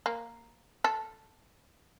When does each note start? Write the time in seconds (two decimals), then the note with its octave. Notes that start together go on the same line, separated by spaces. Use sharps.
0.06 A#3
0.84 A4